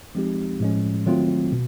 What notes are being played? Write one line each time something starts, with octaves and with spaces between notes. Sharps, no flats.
F3 G#3 C4 D#4 G4
A2 F3 G#3 C#4
D#3 F#3 A3 C4 F4
B2